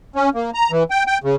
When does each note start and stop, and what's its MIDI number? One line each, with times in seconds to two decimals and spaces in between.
0.16 0.29 61
0.35 0.51 58
0.54 0.71 82
0.71 0.83 52
0.91 1.04 79
1.07 1.18 79
1.24 1.36 49